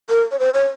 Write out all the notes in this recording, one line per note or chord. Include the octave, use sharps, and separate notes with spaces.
A#4
C#5
C5
C#5